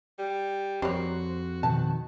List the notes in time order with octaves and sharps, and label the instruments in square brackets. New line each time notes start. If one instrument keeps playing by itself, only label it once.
[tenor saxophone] G3
[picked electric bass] F2 [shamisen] G3 A#4 C#5 [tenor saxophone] F#4 [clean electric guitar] C5
[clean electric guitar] B2 D#3 [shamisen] A5